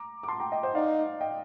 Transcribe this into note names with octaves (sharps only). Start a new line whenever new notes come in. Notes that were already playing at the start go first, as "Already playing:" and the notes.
Already playing: A#5 D6
D6
A5 C6
G5 A#5
D#5 G5
C5 D#5
D#4 D5 F5
D#5 G5